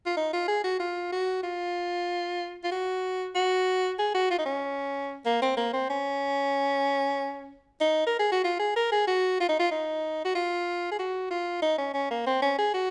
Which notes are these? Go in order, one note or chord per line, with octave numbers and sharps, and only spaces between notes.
F4
D#4
F4
G#4
F#4
F4
F#4
F4
F4
F#4
F#4
G#4
F#4
F4
D#4
C#4
A#3
C4
A#3
C4
C#4
D#4
A#4
G#4
F#4
F4
G#4
A#4
G#4
F#4
F4
D#4
F4
D#4
F#4
F4
G#4
F#4
F4
D#4
C#4
C#4
A#3
C4
C#4
G#4
F#4